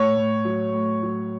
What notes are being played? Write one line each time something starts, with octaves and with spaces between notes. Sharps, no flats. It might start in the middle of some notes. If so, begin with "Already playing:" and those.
Already playing: A2 C#5
A2
F#3
A2
F#3